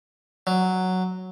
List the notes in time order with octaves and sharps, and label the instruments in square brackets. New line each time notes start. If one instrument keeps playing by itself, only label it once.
[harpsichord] F#3